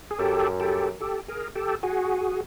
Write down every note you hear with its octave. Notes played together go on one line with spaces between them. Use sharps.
G#4
F#2 G4 A4
G4 A4
G4 A4
G#4 A#4
G4 A4
F#4 G#4